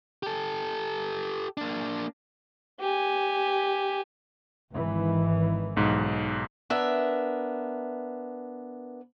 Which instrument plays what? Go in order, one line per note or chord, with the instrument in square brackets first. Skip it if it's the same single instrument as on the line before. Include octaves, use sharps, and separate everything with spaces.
[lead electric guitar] G4 A4
A#3 D4
[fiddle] G4 G#5
[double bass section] G#1 D#3 E3
[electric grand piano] B1 G#2
[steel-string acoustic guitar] B3 D4 A#4 E5